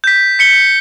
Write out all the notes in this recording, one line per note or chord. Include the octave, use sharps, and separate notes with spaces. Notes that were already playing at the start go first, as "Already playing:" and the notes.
G6 B6
B6 C#7 G7